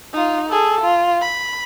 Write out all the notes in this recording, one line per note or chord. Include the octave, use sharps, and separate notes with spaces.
D#4 F4
G#4 A4
F4
B5